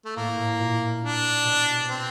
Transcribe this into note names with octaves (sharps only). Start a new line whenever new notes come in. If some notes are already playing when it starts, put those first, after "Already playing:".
A3
A2 A#3
A2
A#2
D4
B2
C4